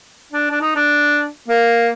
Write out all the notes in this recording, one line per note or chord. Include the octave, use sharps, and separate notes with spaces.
D4
D4
D#4
D4
A#3